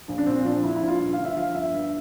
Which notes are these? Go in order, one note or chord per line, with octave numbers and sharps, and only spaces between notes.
A#1
D4
A#2 C4
F3 D4
A#1 E4
E4
A#1
F4
G2
D3 F5
E5
F3 F5
G1 E5
G2